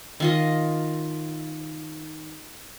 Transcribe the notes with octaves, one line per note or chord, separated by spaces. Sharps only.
D#3 F4 D#5